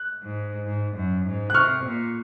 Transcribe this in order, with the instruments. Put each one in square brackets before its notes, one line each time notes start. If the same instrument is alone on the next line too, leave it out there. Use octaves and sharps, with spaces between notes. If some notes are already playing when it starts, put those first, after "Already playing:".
Already playing: [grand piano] F#6
[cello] G#2
G#2
F#2
G#2
[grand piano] F#6
[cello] C3 [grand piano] C#6 F6
[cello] A#2